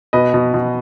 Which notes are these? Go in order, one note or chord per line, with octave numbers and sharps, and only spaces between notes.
B2 B4 D#5
B2
B2